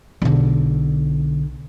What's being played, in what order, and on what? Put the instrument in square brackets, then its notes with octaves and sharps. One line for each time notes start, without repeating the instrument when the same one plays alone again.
[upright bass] B1 D3